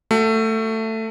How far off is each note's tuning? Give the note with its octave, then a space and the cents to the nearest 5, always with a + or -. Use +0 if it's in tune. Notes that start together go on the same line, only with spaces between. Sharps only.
A3 +15 F#4 +0